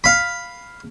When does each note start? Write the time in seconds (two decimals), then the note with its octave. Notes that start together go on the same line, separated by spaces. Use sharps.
0.04 F5 B5